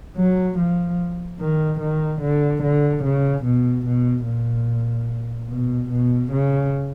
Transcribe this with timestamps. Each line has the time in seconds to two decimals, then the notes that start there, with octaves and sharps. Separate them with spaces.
0.17 F#3
0.59 F3
1.40 D#3
1.80 D#3
2.22 D3
2.63 D3
3.05 C#3
3.45 B2
3.86 B2
4.27 A#2
5.50 B2
5.91 B2
6.32 C#3